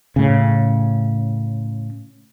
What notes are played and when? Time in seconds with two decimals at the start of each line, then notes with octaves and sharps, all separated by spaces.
0.16 A2 C#3